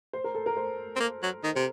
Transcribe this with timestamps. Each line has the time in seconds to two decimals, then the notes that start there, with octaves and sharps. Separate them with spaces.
0.13 C5
0.24 A#4
0.35 A4
0.46 A#4
0.57 C5
0.96 C4
1.00 A#3
1.23 F#3
1.44 D#3
1.56 C3